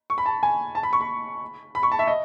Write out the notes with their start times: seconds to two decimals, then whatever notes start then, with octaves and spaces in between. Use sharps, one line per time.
0.10 C#6
0.18 B5
0.26 A5
0.43 G#5
0.75 A5
0.83 B5
0.93 C#6
1.01 B5
1.75 B5
1.83 C#6
1.92 A5
1.99 E5
2.07 D#5